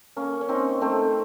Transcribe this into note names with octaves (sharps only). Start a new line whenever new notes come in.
A#3 C#4
C#4
C4 D#4
A3 C4